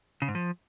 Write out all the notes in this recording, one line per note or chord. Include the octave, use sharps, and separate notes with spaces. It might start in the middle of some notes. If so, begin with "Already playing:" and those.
C#3
G#2
F3